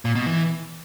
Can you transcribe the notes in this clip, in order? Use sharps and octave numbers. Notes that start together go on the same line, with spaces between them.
A#2
B2
E3